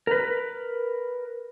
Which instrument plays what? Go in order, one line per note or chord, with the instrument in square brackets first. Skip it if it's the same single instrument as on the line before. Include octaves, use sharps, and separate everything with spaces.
[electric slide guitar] A#4 B4